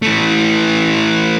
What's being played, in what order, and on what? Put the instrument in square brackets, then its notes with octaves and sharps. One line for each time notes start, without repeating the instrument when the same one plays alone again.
[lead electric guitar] E3 A3